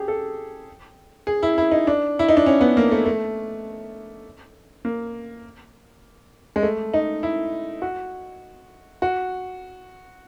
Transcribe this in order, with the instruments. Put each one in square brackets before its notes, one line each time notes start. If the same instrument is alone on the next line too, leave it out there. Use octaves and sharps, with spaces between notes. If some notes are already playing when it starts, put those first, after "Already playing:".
Already playing: [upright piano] G4 G#4
A4
G#4
E4
E4
D#4
D4
E4
D#4
D4
C#4
B3
A#3
A3
A3
A#3
G#3
A3
D#4
E4
F#4
F#4